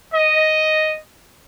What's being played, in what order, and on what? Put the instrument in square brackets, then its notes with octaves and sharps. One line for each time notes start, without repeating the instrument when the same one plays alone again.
[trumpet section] D#5